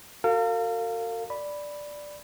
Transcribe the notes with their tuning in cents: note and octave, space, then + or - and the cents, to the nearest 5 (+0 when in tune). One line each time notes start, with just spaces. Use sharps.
F#4 +0 A#4 -45 F5 +0
D5 +0 B5 +0